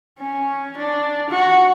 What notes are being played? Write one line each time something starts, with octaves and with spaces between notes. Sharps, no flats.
C#4
D4
F#4